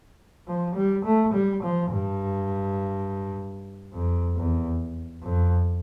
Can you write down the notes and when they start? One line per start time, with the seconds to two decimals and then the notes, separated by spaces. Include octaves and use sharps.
0.48 F3
0.75 G3
1.05 A3
1.33 G3
1.63 F3
1.91 G2
3.93 F2
4.36 E2
5.22 F2